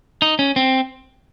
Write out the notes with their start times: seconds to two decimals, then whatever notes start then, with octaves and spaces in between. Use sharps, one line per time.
0.22 D#4
0.39 C#4
0.56 C4